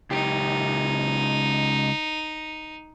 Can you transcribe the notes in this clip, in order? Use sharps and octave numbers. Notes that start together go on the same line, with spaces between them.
C#2 D#4 G4